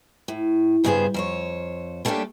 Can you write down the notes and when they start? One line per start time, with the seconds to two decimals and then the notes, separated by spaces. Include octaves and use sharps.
0.28 A2
0.84 E2 G2 C#3 B3 G#4 C5
1.14 F2 C5 C#5
2.05 G3 A3 A#3 C#4 D4 G4